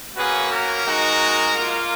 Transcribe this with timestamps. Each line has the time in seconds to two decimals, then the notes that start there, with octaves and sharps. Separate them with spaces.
0.17 A#3 C#4 F#4 G#4 B4
0.52 A#4
0.87 G#3 D#4 F#4
1.55 A#3 F4